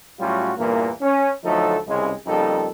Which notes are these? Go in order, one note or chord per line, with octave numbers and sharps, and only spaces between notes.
A2 F#3 G3 C#4 F4 F#4
E2 G2 A#2 E3 A#3
C#4
D2 F3 F#3 A3 D#4 A4
C2 C#3 G#3
F2 C#3 G3 A#3 D#4 A4